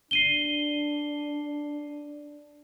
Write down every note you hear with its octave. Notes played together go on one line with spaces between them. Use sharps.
D4 C7 D#7 G7